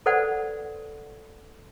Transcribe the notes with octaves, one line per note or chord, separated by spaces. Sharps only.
A4 B4 C5 D5 F#5